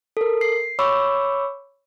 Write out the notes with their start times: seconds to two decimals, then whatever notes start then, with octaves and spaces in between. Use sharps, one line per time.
0.17 A4 A#4
0.41 C7
0.79 C#5 B5 C#6 D6 E6